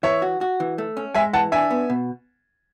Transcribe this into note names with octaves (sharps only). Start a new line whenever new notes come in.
E3 C#5 E5
F#4
F#4
E3
A3
C#4
G#3 E5 G#5
E3 F#5 A5
D4 E5 G#5
B3
B2